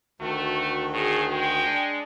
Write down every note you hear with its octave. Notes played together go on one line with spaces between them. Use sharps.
D2 D#3 A3 F#4
A2 G#4
G#3 G5
D4